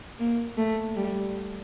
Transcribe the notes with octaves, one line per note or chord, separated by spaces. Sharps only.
A#3
A3
G3